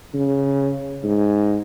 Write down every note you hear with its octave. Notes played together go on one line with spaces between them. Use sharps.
C#3
G#2